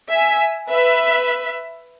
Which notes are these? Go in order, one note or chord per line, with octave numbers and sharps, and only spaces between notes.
E5 G#5
B4 E5